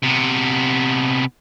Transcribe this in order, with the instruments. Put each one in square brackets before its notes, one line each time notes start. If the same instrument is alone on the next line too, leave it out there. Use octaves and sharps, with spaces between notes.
[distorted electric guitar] C3 B3